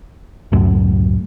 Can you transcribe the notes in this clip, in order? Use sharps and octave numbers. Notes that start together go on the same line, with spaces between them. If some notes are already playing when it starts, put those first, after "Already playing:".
C#2 F#2 A2